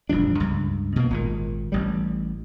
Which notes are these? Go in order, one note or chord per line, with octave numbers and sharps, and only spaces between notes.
E1 G2 F3 D4
C#2 G2
B2 A#3
G#1 A#2 D#3
A1 G3